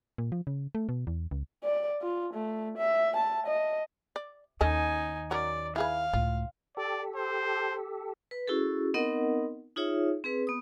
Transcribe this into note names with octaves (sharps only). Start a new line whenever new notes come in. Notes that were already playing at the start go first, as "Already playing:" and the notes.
A#2
F3
C#3
A3
B2
E2
C#2
D5
F4
A3
E5
A5
D#5
D5
D#2 C#4 D#4 A4 D#5 G#5
F#3 C#4 A#4 D5
E4 G#4 B4 F5
C#2 A2 F4
G4 A4 D5
C5
B4
C#4 E4 F#4 G#4 A4
B3 C4 D#4 A#4 D#5 F#5
D#4 F4 G#4 C#5 E5
C4 G#4 B4
B3 D#6